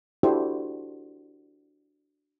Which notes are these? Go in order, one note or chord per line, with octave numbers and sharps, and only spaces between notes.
D4 E4 F#4 G4 A4 C5